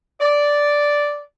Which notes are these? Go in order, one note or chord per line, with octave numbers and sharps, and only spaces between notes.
D5